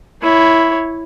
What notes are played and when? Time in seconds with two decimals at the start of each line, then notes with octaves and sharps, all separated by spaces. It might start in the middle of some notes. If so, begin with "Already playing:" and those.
0.22 E4 C#5